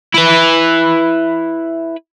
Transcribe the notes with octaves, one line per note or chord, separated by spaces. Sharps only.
E4 B4